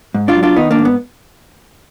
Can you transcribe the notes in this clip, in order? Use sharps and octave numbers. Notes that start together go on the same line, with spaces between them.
G#2
D4 F4
F#3
D4 F4
D#3 B3 D#4
A#3 D4
G#2
B3